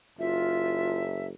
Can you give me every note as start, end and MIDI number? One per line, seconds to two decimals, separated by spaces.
0.19 1.33 30
0.19 0.98 65
0.19 1.27 76